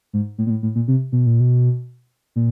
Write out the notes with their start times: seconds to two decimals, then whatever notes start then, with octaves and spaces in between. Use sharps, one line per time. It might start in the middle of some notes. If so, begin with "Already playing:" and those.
0.13 G#2
0.38 A2
0.47 A#2
0.50 A2
0.63 A2
0.75 A#2
0.88 C3
1.12 B2
1.26 A#2
1.40 B2
2.36 A#2